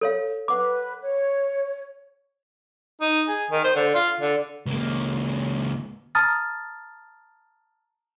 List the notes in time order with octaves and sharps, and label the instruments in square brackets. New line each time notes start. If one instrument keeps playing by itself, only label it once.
[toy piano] A4 C#5 F5
[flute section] B4 [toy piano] F#5 D6
[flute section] C#5
[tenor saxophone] D#4
G#4
D#3
C5
D3
F4
D3
[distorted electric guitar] C#2 A#3
[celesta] A5 A#5 D#6 F6 A6